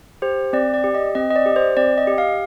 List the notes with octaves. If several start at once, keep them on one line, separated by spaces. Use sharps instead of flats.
G4 C5
C4 D5
D5
G4
D#5
C4 D#5
D#5
D5
G4
C5
C4 D5
D#5
G4
F5